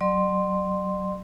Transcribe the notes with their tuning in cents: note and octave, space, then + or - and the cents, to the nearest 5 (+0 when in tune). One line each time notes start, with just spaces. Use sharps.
F#3 +20 D5 +40 C6 +0